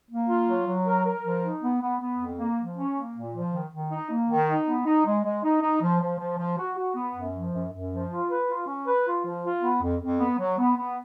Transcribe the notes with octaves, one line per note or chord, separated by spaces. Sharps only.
A#3
F4
F#3
F#3
A#4
A#4
F3
D#4
B3
B3
B3
F2
A#3
F3
C#4
A#3
A#2
F3
D#3
D#3
D#4
A#3
D#3
D#4
B3
D#4
G#3
G#3
D#4
D#4
F3
F3
F3
F3
F#4
F#4
B3
F#2
F3
F#2
F#2
F3
F4
B4
F4
C#4
B4
F4
F3
F4
B3
F2
F2
B3
F#3
B3
B3